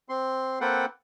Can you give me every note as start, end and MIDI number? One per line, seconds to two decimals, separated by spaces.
0.09 0.59 60
0.09 0.59 84
0.61 0.85 58
0.61 0.85 60
0.61 0.85 69
0.61 0.85 71
0.61 0.85 78
0.61 0.85 79